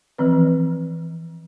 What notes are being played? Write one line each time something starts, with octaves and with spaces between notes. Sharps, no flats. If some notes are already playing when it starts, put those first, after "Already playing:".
E3 F3 C4 B4